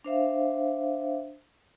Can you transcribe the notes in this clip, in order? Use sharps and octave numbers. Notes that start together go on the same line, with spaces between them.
D4 C5 E5 F5